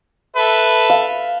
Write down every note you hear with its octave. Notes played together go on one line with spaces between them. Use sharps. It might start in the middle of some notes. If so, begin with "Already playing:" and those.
A4 B4 E5
F5